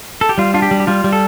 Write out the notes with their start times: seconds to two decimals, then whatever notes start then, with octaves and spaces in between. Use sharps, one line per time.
0.21 A4
0.29 G4
0.38 G3 F4
0.54 D4 F4
0.62 G4
0.71 G3
0.80 G4
0.87 G3 F4
1.04 G3
1.12 A4